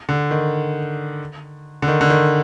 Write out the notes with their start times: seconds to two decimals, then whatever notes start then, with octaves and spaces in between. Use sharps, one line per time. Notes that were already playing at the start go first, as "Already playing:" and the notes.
0.09 D3
0.31 D#3
1.82 D3
1.88 D#3
2.01 D3
2.10 D#3